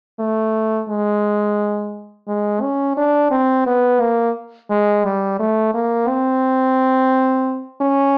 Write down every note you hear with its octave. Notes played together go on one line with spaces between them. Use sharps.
A3
G#3
G#3
C#4
D4
C4
B3
A#3
G#3
G3
A3
A#3
C4
C#4